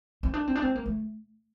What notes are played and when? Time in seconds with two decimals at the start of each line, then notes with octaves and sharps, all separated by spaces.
0.23 C4
0.34 D4
0.48 C4
0.56 D4
0.62 C4
0.76 A#3
0.86 A3